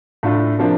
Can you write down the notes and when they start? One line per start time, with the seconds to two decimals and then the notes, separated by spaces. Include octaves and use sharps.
0.23 A2 A3 D4 F4
0.59 C3 F3 A#3 D4